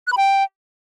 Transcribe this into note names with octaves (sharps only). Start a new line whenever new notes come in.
F#6
B5
G5